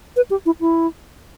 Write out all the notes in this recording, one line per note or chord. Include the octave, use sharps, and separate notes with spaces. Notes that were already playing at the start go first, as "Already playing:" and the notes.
B4
G4
E4
E4